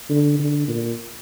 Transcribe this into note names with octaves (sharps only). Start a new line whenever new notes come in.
D3
D3
A#2